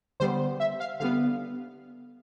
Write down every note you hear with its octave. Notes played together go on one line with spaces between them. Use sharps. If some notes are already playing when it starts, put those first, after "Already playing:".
D3 G3 B3 C5
E5
F5
D3 G3 B3 F5